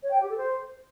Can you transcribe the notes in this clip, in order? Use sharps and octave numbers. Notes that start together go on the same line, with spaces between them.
C#5
G5
G4
A4
C5